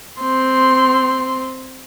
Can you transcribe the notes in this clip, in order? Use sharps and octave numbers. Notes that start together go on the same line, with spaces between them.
C4 C6